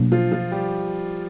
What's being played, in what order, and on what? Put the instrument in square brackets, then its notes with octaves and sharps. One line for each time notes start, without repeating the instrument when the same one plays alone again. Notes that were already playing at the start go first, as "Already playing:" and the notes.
Already playing: [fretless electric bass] B2 F#3 A#3 D4
[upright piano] F3 F4
F3 F4
G3 G4